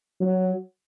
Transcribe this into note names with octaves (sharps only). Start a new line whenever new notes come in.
F#3